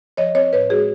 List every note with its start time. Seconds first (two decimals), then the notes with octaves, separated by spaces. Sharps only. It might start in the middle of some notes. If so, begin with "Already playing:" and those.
0.17 F3 C#5 D#5
0.35 C4 C#5 D#5
0.53 A2 B4 C#5
0.70 G#3 F#4 G#4